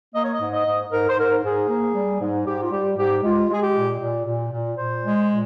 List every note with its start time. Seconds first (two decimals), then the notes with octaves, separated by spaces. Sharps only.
0.15 A#3 D#5
0.24 C#5
0.32 D#5
0.41 G#2
0.54 D#5
0.66 G#2
0.92 G#2 A#4
1.10 C5
1.18 G#2 A#4
1.43 G#2 G#4
1.69 A#3
1.95 G3
2.20 G#2
2.46 G#2 G4
2.62 F4
2.72 G3 G4
2.97 G#2 G4
3.23 G#3 F4
3.49 G#3 G#4
3.62 G4
3.75 A#2
4.00 A#2
4.26 A#2
4.52 A#2
4.77 A#2 C5
5.03 G#3
5.29 A#2